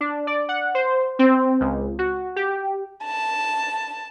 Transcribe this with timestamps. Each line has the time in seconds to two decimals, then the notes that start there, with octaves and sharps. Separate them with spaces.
0.01 D4
0.27 D5
0.49 F#5
0.75 C5
1.19 C4
1.61 C#2
1.99 F#4
2.36 G4
3.04 A5